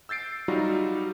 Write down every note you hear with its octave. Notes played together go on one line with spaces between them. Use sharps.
E6 G6 A6 C7 D7
F#3 G3 D#4 F4 F#4